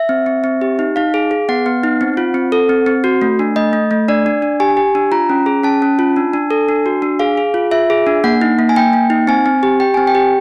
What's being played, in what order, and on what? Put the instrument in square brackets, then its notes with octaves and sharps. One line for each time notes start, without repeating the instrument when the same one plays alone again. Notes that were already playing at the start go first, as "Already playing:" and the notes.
Already playing: [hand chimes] E5
C4
C4
C4
G4
D#4
D#4 F5
G#4
G#4
B3 F#5
B3
D#4
C4
F4
C4
A4
C4
C4
F#4
A3
D4
A3 D#5
A3
A3
D4 D5
D4
D4
G4 G#5
G4
D4
F4 A#5
C#4
G#4
C#4 A5
C#4
F4
D4
D4
A4
D4
F#4
D4
G#4 F5
G#4
F4
F4 E5
G#4
D4
A#3 F#5
D#4
A#3
G#5
A#3 G5
A#3
D#4
C4 G#5
C4
G4
G4 G5
C4 G#5
G5
G4